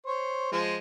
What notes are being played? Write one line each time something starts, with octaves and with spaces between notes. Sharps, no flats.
C5 C#5
F3 G#3